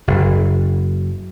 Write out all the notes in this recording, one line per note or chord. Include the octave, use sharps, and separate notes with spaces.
F#1